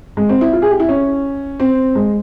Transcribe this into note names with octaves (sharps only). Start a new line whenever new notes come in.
G#3
C4
E4
F4
G#4
G4
E4
C#4
C4
G#3